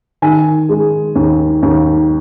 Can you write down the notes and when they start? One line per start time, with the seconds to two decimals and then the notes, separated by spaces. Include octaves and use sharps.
0.22 D#3 G#5
0.69 G#3
1.15 D#2
1.62 D#2